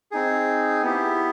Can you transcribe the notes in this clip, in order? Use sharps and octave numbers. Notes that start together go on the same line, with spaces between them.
C4 D#4 G#4
B3 E4 G4